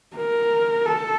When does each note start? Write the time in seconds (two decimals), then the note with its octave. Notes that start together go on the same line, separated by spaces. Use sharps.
0.16 A#4
0.86 A4